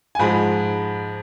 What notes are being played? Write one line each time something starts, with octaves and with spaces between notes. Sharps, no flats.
G#5
G#2 F3 G#3 B5